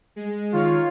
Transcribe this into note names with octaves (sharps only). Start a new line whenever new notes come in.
G#3
D#3 F4 C#5 F5